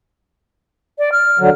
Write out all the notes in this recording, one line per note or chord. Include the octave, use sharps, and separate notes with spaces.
D5
F6
D3 F#3